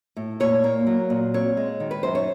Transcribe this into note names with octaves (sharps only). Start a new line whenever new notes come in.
A2
A#2 C#5
A#3
F#3
A#2
C4 C#5
G#3
D#3
B4
F#2 C5
C#5